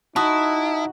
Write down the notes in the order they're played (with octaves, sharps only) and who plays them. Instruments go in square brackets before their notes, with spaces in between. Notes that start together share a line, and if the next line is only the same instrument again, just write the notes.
[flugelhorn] D#4 [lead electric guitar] E4 [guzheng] F#4 [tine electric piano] A5 D#6